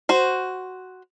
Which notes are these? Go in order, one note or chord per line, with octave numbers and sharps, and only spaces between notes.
F#4 C5